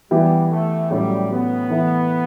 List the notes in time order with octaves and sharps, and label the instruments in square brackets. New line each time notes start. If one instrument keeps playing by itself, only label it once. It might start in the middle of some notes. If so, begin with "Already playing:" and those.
[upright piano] E3 B3 E4 G4 [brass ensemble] G3
[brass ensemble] A3
[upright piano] A2 F#3 C#4 E4 A4 [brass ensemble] G3
[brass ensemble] B3
[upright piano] E3 A3 E4